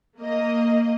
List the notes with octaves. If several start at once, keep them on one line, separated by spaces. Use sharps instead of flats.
A#3 D#5